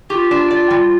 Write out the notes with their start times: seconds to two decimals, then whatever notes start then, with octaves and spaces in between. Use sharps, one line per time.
0.10 F4 G4
0.31 D4
0.51 D5
0.70 G3